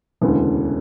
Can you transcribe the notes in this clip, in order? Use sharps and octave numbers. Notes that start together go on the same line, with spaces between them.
E1 D2 C#3 E3